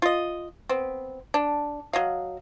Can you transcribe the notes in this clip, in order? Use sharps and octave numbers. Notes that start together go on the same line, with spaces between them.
F4 D#5
B3 C4
D4
F#3 D#5 F5